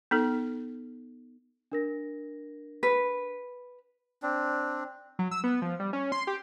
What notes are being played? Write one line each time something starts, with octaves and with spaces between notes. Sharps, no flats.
B3 D#4 A4
D4 A#4 A#6
B4
C4 D4
F#3
E6
B3
F3
G3
C#4
C6
G4